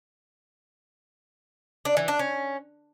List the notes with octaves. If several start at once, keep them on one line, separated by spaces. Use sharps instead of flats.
D4
E3
D4
C#4